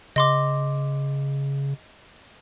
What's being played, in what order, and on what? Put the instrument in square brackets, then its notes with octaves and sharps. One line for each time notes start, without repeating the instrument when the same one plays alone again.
[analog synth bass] C#3 [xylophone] D#5 C6 D6